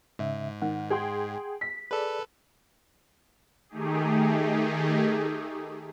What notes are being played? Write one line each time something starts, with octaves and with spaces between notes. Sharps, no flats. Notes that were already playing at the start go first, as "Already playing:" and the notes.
G#2 C#3 E5
D#3 F#5
G#4 G5 C6
B6
G#4 A4 B4 D5
D#3 A3 D#4 G4 G#4